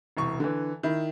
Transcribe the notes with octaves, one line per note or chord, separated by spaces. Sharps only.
E1 C2 C#6
D3 E3
D#3 E4